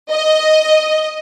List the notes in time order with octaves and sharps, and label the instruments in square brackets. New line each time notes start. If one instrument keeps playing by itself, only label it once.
[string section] D#5